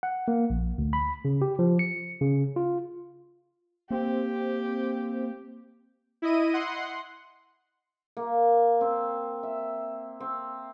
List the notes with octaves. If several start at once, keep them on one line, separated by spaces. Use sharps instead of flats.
F#5
A#3
A#1
D2
B5
C#3
G4
F3
C#7
C#3
F4
A#3 C4 G4
E4 D#5 D#7
F#5 C6
A#3
C4
E5
C4